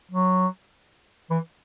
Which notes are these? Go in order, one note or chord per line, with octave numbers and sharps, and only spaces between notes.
F#3
E3